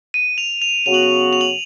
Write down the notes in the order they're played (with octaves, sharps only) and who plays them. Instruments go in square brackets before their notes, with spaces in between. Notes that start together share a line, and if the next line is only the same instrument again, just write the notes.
[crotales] D#7
F7
F7
[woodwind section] C#3 F#3 B3 F#4 [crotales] F7
[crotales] F#7
F7
F7
F#7